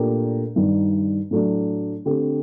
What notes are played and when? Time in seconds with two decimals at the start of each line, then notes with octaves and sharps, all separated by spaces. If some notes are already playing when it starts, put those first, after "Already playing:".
Already playing: A#2 A3 D4 G4 A#4
0.56 G2 D#3 G3
1.31 A2 F#3 A3 D4
2.05 D3 A3 C4 G4